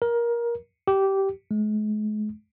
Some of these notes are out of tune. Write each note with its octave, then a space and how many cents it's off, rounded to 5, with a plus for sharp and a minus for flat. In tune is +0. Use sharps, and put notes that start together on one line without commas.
A#4 +20
G4 -15
G#3 +40